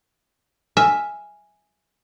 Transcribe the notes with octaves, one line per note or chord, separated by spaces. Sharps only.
E5 G#5 F6